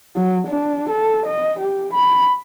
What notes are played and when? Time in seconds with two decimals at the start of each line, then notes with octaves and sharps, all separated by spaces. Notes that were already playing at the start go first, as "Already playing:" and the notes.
0.16 F#3
0.47 D4
0.90 A4
1.27 D#5
1.60 G4
1.94 B5